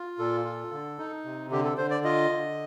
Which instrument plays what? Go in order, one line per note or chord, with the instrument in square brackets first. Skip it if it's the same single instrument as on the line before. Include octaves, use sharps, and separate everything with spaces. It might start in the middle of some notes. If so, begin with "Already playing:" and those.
Already playing: [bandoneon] F4
A#2 A4
F4
D3
D#4
C3
D3 G4
A4
D3 C5
D5
F4 D#5
D3